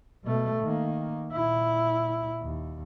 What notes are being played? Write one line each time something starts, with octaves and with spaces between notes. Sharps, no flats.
B2 A3
D#3 A#3
A#2 E4
D#2